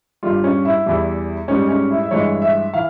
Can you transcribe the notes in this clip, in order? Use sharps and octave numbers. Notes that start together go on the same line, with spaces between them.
G2 G3 F4
C#4
E4
E2 E3 G3 E4
G#2 G3 C#4
C#4
E4
E5
G2 E3 G#3 C#5
E5
E3 F5